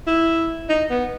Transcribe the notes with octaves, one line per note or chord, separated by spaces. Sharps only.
E4
D#4
B3